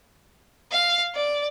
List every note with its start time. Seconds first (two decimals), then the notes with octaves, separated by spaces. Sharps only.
0.72 F5
1.15 D5